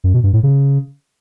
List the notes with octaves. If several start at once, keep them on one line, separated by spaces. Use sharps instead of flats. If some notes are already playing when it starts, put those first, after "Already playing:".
F#2
B2
G2
A2
C#3